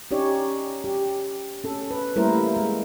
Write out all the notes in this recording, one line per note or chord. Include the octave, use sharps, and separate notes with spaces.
C#4 D#4 G4 C#5 D5
G4
C#4 A4
B4
G3 A3 A#3 E4 A#4 C5
G#3